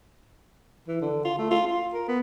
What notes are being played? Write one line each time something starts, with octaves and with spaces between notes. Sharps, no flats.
E3
D3
F4
A3
F4
F4
A#4
B3